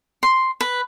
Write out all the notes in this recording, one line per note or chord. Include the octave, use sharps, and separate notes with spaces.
C6
B4